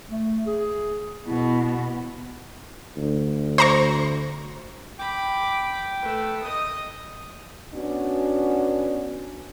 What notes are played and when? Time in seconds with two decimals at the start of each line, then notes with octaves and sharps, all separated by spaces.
0.11 A3
0.46 G#4
1.27 B2 E4
2.97 D2
3.58 C5 A#5 C#6
4.99 G5 B5 D6
6.01 A3 B4
6.41 D#5 D#6
7.74 B3 C#4 D4 F#4